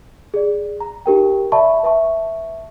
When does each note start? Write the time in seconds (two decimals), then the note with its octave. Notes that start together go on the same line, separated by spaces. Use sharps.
0.34 G#4 D5
0.80 A#5
1.06 D#4 G4 A#4 G5
1.52 D5 E5 A5 B5 C#6
1.83 B4 E5 A5 C#6